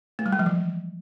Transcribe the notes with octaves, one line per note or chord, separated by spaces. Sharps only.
A3
G3
G#3
F3
E3